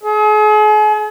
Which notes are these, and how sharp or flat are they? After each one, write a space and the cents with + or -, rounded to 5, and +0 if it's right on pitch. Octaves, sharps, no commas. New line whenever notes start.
G#4 +40